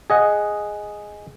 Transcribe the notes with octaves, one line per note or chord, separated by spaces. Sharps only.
G#4 D#5 F#5